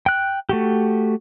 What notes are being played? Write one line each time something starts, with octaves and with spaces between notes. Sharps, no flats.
G5 F#6
A3 F#4 G4